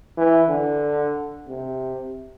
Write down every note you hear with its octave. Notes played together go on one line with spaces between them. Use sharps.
E3
D3
C3